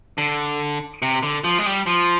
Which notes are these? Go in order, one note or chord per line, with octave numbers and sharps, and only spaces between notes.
D3
C3
D3
F3
G#3
G3
F3